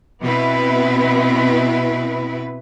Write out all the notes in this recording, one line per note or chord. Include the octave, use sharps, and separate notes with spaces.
B2 B3 C4 E4 B4